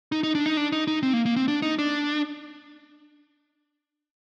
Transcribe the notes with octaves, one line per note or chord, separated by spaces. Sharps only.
D#4
D#4
D4
D#4
D4
D#4
D#4
C4
A#3
A#3
C4
D4
D#4
D4